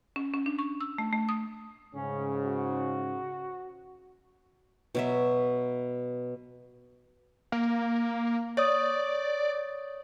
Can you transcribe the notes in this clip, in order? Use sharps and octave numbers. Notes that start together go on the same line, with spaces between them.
C#4
C#4
D4
C#6
E6
A3
A3
D#6
G#2 C#3 C#4
F#4
B2 F#3 E5
A#3
C#5 D5 D#6